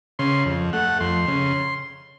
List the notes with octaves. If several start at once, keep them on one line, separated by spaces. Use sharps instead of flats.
C#3 C6
F2
A3 F#5
F2 C6
C#3